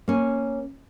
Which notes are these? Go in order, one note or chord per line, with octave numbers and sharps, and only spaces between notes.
A#3 C#4